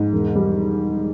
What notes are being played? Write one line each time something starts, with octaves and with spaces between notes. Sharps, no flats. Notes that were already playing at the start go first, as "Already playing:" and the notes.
Already playing: G#2
E1
G3